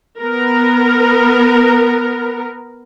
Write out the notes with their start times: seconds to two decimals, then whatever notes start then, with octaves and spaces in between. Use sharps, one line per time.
0.21 B3 A#4